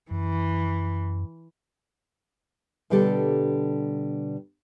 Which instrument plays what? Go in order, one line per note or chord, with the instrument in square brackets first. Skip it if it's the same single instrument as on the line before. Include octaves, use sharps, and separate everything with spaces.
[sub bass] F#2 [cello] E3
[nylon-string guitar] B2 D3 G3 D4 G4 A4